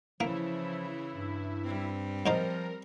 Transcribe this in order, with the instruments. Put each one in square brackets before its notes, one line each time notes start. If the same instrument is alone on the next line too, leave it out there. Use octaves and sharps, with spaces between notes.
[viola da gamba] C#3 E3 [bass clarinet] F3 [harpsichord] A#3 [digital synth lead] E4
[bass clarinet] G2
[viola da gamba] G3 C4
[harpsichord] G#2 D#4 C5 [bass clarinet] F3 [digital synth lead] A#4